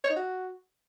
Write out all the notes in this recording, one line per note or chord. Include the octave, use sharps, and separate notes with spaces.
C#5
D#4
F#4